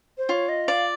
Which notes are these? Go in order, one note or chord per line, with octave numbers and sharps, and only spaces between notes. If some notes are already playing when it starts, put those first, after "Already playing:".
C5
F4 C#5
D#5
D5 F5